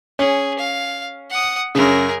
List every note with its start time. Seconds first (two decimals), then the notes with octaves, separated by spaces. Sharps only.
0.19 C#4 G#4
0.59 F5
1.30 F#5 D#6
1.75 F#2 C#3 G#4 A#4